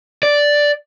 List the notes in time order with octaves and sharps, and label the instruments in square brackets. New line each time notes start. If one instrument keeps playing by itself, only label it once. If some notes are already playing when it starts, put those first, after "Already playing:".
[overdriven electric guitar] D5